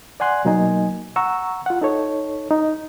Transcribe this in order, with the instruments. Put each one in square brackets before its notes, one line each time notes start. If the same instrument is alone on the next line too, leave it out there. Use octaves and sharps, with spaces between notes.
[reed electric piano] D5 F#5 G#5 C6 F#6
B2 F#3 A#3 D#4 D#5 G#5
F#5 A#5 C#6 E6
F4 F#5
D#4 A4 C#5
D#4